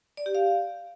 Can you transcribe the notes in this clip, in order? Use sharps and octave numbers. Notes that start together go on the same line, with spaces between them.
D5
G4
F5